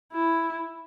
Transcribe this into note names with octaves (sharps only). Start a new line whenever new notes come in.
E4